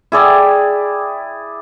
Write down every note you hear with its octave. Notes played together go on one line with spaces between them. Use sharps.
E4 G#4 D5 G5